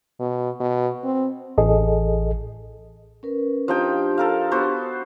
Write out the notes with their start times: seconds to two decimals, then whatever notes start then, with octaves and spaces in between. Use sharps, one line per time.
0.19 B2
0.60 B2
1.04 C4
1.58 A1 G#4 A4 D#5
3.23 C#4 A#4 B4
3.68 F3 D4 D#4 G4 G5
4.18 A4 A#4 F5
4.51 B3 F#4 C5